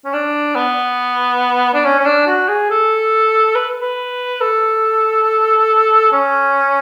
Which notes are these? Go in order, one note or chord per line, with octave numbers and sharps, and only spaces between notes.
C#4
D4
B3
D4
C#4
C#4
D4
F#4
G#4
A4
B4
B4
A4
C#4